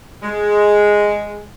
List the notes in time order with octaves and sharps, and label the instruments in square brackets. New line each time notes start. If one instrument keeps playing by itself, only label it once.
[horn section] G#3